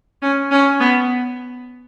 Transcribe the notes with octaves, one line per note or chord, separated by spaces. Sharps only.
C#4
C#4
B3